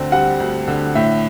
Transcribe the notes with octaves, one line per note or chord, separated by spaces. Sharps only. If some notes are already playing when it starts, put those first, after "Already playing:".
Already playing: D2 D3 C4
G3 F#5
D2
D3
A2 E5